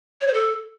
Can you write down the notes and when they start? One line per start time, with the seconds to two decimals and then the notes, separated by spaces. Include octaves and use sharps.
0.21 C#5
0.27 C5
0.34 A4